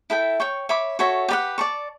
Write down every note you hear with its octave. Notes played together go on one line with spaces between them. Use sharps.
E4 A4 E5 G5
C#5 G5 C#6
C#5 E5 B5 D6
F#4 A4 C#5 E5
G4 B4 D5 F#5
D5 A5 C#6